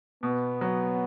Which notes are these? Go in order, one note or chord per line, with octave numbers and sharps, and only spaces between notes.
B2 B3
F#3